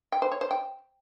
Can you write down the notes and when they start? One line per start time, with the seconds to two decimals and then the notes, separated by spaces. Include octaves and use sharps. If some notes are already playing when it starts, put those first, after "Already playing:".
0.12 G5
0.22 C5
0.32 C#5
0.41 C5
0.51 G5